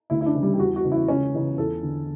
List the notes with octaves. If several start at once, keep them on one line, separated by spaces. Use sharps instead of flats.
D2 E4
E4
D4
C#3 E3
G3
G4
E2 F#4
F#4
C#3 E3
E4
C#2 C#4
C#3 E3
E2 A4
D3